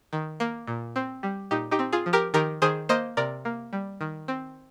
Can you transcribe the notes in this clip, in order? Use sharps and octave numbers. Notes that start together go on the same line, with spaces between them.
D#3
A#3
A#2
C4
G3
A#2 D#4 G4
D#4 G4
C4
F4 G#4
F3
G4 A#4
D#3 G4 A#4
D#3 G#4 C5
A#3 C5 D#5
C3 A#4 D5
A#3
G3
D#3
C4